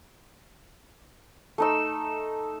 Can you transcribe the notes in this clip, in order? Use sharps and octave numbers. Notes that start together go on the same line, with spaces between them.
A3 D#4 E6